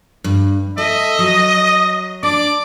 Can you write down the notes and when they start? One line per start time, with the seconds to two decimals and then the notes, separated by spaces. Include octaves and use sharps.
0.24 G2
0.78 A4 D#5 E5
1.19 F#3 D#6
2.23 D4 D5 D6